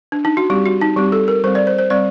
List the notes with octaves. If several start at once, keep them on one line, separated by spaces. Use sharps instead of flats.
D4
D#4
F#4
G3 C4 G4
F#4
D#4
G3 C4 G4
A4
A#4
G3 C4 C5
D5
C5
C5
G3 C4 D5